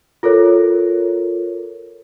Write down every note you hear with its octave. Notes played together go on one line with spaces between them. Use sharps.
F4 A4 A#4 C#5